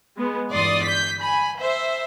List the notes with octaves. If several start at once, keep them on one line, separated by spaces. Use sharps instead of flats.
G#3 B3
G1 E2 D5 C6 D#6
G6 B6
G#5 B5
C5 E5